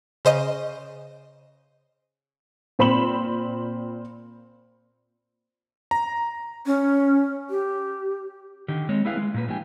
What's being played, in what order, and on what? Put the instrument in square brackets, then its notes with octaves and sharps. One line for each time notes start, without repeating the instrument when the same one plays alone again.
[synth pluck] C#3 C5 D#5 D#7
[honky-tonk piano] A#2 C4 B5 C6 E7 F#7
[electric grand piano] A#5
[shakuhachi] C#4
G4
[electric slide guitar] D3 D#3 G4
G#3 C4 C#5
B3 E4 G#4 B4 F5
G#3
A#2 A#3 B4
E3 G3 D4 G4 G#5